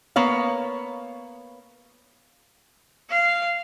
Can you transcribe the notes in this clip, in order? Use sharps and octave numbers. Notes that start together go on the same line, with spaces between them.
A#3 B3 C#5 F5
F5